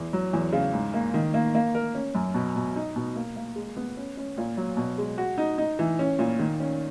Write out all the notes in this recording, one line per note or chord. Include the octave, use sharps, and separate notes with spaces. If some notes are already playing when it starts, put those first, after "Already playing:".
Already playing: E2
F#3
E2
C#3
G#2
A#3
D#3
A#3
A#3
A#4
C#4
F#2
B2
B2
D#4
B2
A#3
A#3
G#3
B3
C#4
C#4
A#2
F#3
B2
G#3
F#4
D#4
D#4
E3
C#4
A#2
D#3
C#4